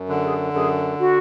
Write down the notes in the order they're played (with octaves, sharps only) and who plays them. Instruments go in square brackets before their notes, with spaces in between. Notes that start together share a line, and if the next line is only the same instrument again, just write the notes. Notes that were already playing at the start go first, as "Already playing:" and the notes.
Already playing: [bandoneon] F#2
D3
[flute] G#4
[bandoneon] F#2 [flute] G#4
[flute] F#4